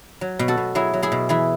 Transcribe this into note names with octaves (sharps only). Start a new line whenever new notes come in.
F#3
B2
F#4 A4
B2
F#3 E4 G#4
F#3
E4 G#4
B2
E3 E4 G#4